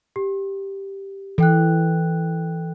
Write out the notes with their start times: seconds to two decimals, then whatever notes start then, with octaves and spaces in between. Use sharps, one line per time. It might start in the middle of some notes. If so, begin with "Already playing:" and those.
0.16 G4
1.38 E3 A4 G5 F#6